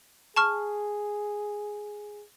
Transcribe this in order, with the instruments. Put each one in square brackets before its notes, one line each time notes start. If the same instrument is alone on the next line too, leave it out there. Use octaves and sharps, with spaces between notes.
[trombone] G#4 [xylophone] A5 C#6 F6